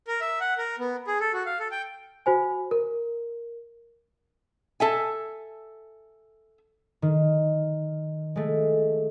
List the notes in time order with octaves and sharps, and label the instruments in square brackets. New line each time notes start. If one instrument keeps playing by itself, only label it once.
[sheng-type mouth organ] A#4
E5
F#5
A#4
B3
G#4
A4
F#4
F5
A4
G5
[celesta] F#4 C5 G#5
A#4
[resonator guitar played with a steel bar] A4 E5 G#5
[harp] D#3
G#3 A3